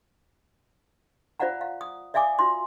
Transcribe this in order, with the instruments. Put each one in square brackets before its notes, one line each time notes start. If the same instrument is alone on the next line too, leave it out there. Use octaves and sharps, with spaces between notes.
[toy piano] F4 C5 D5 F5 F#5 A#5
F5
D#6
D5 E5 F5 G#5 D6 D#6
F4 F#4 C6